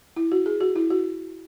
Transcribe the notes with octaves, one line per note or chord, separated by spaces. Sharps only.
E4
F#4
G#4
F#4
E4
F#4